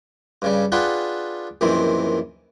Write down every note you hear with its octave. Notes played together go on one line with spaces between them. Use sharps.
G2 C#3 G3
D4 F4 G#4 B4 F#5 G5
A#1 F#2 D#3 E3 C4